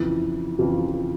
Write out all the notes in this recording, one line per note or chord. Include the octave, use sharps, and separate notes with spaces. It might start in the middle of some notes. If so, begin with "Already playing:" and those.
Already playing: F2 C#3 E3 E4
F2 C#3 E3 F3 F4